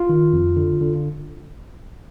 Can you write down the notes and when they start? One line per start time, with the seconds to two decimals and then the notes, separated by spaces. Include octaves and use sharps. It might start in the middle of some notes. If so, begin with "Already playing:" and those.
Already playing: F4
0.09 D#3
0.33 F2
0.57 D3
0.81 D3